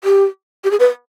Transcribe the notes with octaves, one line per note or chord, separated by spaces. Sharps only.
G4
G4
G#4
B4